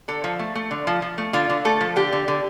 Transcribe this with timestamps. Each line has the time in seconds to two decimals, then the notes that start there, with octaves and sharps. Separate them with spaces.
0.08 D3 A4
0.24 F3
0.39 A3
0.55 A3
0.71 D3
0.87 F3
1.02 F3
1.18 A3
1.33 D3 F4
1.49 D3
1.65 A3 A4
1.81 F3
1.96 D3 G4
2.13 D3
2.28 D3